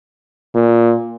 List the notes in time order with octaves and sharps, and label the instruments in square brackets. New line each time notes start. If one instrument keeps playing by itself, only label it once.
[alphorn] A#2